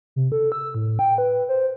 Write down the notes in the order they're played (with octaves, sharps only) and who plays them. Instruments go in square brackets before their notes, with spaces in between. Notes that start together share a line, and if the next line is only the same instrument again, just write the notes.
[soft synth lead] C3
A4
E6
A2
G5
B4
C5